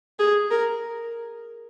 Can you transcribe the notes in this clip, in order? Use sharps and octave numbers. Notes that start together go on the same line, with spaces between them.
G#4
A#4